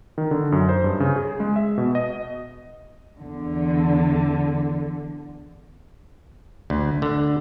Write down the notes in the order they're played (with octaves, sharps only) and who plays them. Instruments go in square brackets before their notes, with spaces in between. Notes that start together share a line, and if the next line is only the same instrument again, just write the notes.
[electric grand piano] D#3
D3
F#2
C5
G2
C#3
G#4
G#3
E5
B2
D#5
[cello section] E2 D3
[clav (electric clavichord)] D2
D3